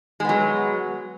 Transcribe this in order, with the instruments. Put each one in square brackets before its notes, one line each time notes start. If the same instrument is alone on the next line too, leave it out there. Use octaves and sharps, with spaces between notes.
[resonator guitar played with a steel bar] G#3
B3
F#3